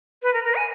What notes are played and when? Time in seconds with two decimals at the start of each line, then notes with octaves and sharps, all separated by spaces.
0.23 B4
0.34 A#4
0.44 A#4
0.55 G#5